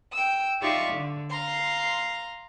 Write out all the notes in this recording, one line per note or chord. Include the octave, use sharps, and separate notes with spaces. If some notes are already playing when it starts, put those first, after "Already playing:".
G5 E6
D#4 F4 G4 D5 E5 C#6
D3
F5 A#5 C6